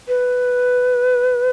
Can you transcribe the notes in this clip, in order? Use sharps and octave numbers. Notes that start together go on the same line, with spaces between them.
B4